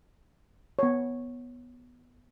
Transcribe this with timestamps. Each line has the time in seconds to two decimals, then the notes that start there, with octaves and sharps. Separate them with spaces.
0.79 B3 C#5